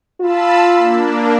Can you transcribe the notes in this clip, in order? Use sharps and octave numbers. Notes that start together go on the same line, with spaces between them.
F4 A5 B5 E6
A#3 D4